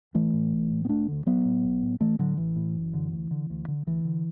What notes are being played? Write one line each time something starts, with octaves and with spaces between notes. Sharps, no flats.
A1 E3 A3
A2
B1
A2
B3
E1 A3 D4
D2 D3
A1 F#3 B3
A2
B1
A2
A1 E3 A3
A2 D3 F#3
A1 E3
A2
F#1
F#2 D3
D2
D3
D2
D3
D2 E3
D3